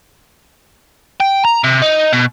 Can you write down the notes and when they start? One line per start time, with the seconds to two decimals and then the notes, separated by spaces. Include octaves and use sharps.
1.20 G5
1.45 A#5
1.64 C3
1.82 D#4
2.13 B2